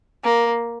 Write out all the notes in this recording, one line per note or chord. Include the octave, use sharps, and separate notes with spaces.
A#3